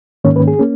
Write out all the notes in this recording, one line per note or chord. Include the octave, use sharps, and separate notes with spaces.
G#2 D#3 A#3 C#4 C#5
B4
G#4
A#3 C#4